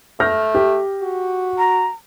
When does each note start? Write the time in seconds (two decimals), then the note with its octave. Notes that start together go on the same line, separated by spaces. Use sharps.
0.20 A3 F6 G6 A#6
0.55 G4
1.03 F#4
1.58 A#5